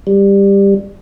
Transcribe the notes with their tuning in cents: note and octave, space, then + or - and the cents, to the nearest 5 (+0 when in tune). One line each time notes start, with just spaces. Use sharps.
G3 +15